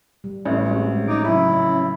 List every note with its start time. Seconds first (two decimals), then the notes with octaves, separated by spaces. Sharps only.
0.24 G3
0.45 A1 E4 A4
0.66 G#3 C4 F#4 C#5
1.07 F3 C#4 D#4 D#5 D6
1.25 C#3 F#3 C#4 E4 E5